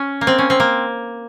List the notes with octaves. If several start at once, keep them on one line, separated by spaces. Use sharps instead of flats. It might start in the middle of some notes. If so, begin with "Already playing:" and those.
Already playing: C#4
A#3
C4
C#4
C4
A#3